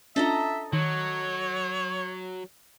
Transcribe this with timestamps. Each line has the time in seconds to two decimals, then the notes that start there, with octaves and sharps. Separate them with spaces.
0.16 C#4 D4 F4 A4 D#5 E5 A#5
0.73 D#3 F#3 C#5